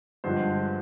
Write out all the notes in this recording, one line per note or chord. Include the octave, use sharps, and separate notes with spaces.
G2 D3 F3 G#3 C5